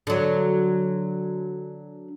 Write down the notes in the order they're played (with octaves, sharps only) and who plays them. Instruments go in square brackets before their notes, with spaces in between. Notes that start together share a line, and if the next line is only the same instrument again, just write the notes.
[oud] D3 F#3